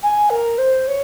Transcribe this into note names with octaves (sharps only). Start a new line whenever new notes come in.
G#5
A#4
C5
C#5